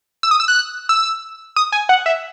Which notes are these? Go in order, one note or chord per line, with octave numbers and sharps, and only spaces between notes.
E6
D#6
E6
F#6
E6
D#6
G#5
F#5
E5